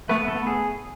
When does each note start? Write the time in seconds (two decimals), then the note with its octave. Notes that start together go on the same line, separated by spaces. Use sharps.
0.09 A3 B3 B4
0.28 A3 A4
0.34 B3
0.47 G#4